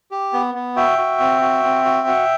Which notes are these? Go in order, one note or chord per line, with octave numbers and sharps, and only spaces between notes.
G4
B3
B3
F#4 E5 G5
F#4
C4
F#4
C4
F#4
F#4